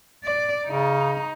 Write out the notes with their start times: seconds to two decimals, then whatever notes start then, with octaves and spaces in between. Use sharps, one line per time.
0.24 D5
0.67 C#3 D#4